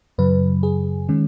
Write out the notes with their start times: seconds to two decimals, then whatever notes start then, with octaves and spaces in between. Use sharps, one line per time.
0.18 F#2 C#3 F#3 B4
0.63 G#4
1.09 D#3 G#3 C#4